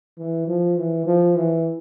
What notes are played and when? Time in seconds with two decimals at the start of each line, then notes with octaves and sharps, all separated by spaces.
0.18 E3
0.48 F3
0.77 E3
1.06 F3
1.36 E3